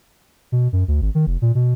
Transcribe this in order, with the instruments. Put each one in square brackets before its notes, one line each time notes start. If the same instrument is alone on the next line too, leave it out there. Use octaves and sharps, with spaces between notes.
[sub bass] B2
F#2
D2
G#1
D#3
F1
A#2
B2